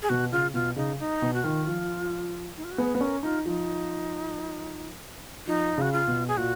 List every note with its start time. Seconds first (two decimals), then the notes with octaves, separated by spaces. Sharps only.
0.02 G#4
0.09 B2 F#4
0.32 C#3 F4
0.54 B2 F4
0.76 C#3 D#4
0.99 D#4
1.22 B2
1.34 F#4
1.44 D#3 F4
1.67 F3
2.57 D#4
2.64 F4
2.71 F#4
2.78 B3 G#4
2.95 B3
3.01 C#4 A#4
3.23 D#4 F4
3.46 F3 D#4
5.47 F3 D#4
5.78 C#3 F#4
5.92 F4
6.08 B2
6.28 G#4
6.37 A#2 F#4